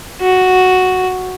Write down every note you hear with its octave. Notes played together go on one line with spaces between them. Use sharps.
F#4